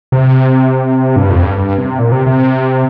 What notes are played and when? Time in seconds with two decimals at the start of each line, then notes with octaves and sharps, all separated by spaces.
0.12 C3
1.16 G2
1.30 F2
1.43 G2
1.57 G2
1.78 C3
1.99 A#2
2.12 C3
2.27 C3